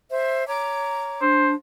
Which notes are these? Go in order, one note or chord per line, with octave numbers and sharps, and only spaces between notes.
C5 E5
C#5 A#5 D6
D4 C5